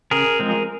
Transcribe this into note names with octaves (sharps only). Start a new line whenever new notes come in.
C#3 G#4 A#4
F3 G#3 C4